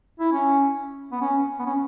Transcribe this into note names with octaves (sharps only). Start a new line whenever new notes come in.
E4
C#4
B3
C#4
B3
C#4